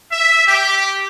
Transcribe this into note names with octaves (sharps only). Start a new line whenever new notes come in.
E5
G4